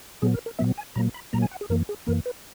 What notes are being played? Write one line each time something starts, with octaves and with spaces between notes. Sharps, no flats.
A#2 F#3 B3 G#4
A#4
A#4
A#2 F#3 B3 E5
G#5
A#2 F#3 A#3 A#5
B5
A#2 F#3 A#3 A#5
G#5
F#5
G#4
F#2 E3 A#3 A#4
G#4
F#2 E3 A#3 A#4
B4